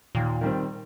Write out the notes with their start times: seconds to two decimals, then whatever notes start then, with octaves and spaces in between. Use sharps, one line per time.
0.15 D#2 A#2
0.41 D#3 G3 C4